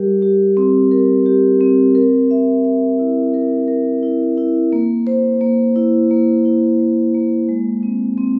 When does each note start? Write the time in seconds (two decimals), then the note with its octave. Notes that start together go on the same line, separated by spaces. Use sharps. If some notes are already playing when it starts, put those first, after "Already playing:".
Already playing: G3 G4 A#4
0.22 G4
0.57 C4
0.91 A#4
1.26 G4
1.61 C4
1.95 A#4
2.31 E5
2.65 E5
2.99 E4
3.34 A#4
3.68 A#4
4.03 E4
4.37 E4
4.73 A#3
5.07 C5
5.41 A#3
5.76 E4
6.11 A#3
6.45 E4
6.80 C5
7.14 A#3
7.49 G#3
7.83 C4
8.18 C4